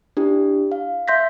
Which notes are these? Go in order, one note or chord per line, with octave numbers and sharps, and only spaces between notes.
D4 E4 G4
F5
E5 C6 G6 A#6 B6